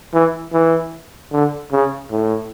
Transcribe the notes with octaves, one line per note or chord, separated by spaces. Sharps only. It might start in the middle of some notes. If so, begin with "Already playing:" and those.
E3
E3
D3
C#3
A2